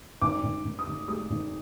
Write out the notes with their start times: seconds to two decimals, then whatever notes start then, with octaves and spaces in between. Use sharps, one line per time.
0.21 G#1 D6
0.43 G#1
0.64 G#1
0.79 D#6
0.87 G#1
1.08 G#3 D#6
1.30 G#1